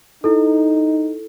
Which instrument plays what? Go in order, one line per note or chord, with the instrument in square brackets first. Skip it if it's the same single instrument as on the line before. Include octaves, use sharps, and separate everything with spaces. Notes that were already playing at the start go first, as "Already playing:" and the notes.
[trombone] D#4 [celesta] E4 A4